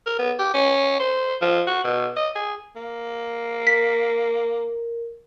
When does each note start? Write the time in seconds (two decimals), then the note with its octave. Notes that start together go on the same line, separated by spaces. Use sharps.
0.06 A#4
0.19 B3
0.39 G4
0.54 C#4
1.00 C5
1.42 F3
1.67 F#4
1.84 B2
2.16 D#5
2.35 G#4
2.76 A#3
3.67 A#4 B6